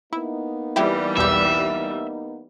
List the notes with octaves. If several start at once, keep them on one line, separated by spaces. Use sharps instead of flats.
A#3 B3 D#4 E4
E3 G3 E4 G4 B5
B1 E2 G4 E5